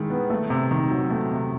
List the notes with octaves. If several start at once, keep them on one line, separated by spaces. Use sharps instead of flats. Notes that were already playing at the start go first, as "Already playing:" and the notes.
Already playing: D#3 G#3 E4
B3
A3
C3
D#3
F#3
A3
C3